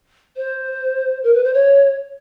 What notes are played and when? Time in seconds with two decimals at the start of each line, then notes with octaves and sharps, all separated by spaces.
0.37 C5
1.24 A#4
1.34 B4
1.44 C5
1.54 C#5